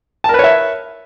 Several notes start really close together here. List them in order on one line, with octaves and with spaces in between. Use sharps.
A5 A#4 B4 C#5 E5